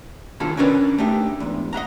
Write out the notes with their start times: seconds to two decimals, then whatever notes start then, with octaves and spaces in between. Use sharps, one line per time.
0.40 C2 D3 D#3 F4 G#4 A4
0.57 C#4 D4 A#4 B4 C#5 D5
0.98 A3 D4 D#4 G4
1.40 E2 G#2
1.73 D#5 E5 F#5 A#5